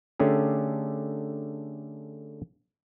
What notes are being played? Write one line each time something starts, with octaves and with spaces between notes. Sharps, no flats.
D3 A3 C#4 G4 G#4